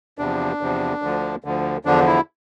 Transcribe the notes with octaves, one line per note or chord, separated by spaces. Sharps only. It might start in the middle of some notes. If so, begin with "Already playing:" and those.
E2 C3 F3 D4
E2 C3 F3
D2 D3 F3
D2 D3 F3
E2 D3 F3 D4
E4